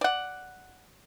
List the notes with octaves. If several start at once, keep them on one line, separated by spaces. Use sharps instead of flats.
D5 F#5